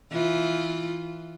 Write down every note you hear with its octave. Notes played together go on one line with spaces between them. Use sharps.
E3 F4